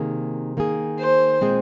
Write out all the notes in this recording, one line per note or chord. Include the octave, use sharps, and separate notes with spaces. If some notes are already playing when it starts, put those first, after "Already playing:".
Already playing: C3 D#3 A#3 G#4
D#3 A#3 G#4
C5
A#2 G#3 C4 G#4